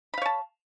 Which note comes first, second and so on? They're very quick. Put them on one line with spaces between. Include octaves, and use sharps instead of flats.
B5 F5 C#5 A5